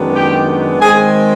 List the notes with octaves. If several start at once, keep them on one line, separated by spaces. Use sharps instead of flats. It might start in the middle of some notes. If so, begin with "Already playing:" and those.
Already playing: F#2 D#3 G#3 B3 D4
G4 G5
D#3 G#3 C4 G#4 G#5